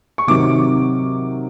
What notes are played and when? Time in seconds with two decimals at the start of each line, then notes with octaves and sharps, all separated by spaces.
0.18 C#6
0.27 C3 D#3 F#3 D6